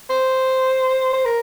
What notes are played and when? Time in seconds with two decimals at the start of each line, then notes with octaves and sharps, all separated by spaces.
0.10 C5
1.13 C5
1.25 A#4